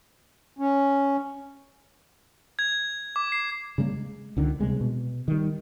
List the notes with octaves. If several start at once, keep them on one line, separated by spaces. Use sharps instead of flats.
C#4
G#6
D6
C7
C#3 G3 G#3 A#3
G#3
C#2 D3 D#3
C3 G3 G#3 B3
B2
D#3 G3